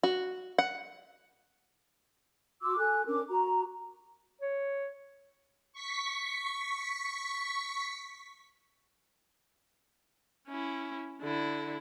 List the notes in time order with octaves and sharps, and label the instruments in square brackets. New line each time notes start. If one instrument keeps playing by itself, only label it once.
[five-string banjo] F#4
F#5
[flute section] F#4 C6 D6 E6
A4 G#5 F#6
C#4 D4 A#4 D6
F#4 A#5
[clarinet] C#5
[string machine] C#6 B6
[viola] C#4 E4
D3 E4